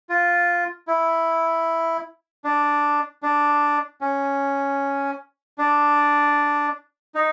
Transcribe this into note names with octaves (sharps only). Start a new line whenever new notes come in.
F4
E4
D4
D4
C#4
D4
D#4